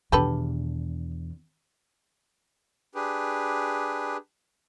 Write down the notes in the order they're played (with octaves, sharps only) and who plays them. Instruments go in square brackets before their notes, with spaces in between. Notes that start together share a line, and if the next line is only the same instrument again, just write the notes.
[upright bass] E2 D4 [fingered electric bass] B2 D#3 E3 [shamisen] G4 A4 B4
[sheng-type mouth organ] D4 G4 G#4 B4